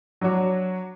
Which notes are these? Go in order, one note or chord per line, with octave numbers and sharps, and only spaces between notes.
F#3 D4 F#4 C#5